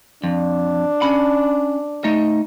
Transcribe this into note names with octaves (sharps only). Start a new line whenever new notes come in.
F2 D4
C#4 B5
A3 D#4 D#5